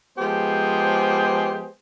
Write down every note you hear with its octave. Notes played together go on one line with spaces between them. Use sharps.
F3 G#3 B3 G4 G#4 C5